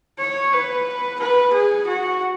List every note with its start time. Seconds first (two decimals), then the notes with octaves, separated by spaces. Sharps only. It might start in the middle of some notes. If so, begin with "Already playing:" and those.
0.19 C#5
0.53 B4
1.20 B4
1.53 G#4
1.87 F#4